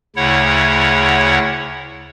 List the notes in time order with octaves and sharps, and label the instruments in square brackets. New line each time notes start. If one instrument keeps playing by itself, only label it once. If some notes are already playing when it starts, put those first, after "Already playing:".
[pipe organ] D2 C#3 E4 C#5 F#5